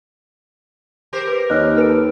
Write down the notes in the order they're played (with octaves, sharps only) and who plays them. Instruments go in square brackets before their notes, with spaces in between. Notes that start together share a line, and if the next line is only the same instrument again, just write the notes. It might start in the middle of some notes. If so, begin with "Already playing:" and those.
[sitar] G4 A#4 C5
[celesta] B4
[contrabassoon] D#2 [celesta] C#5 F6 F#6 [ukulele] D#5
[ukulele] A4 B4 [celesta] F6 D7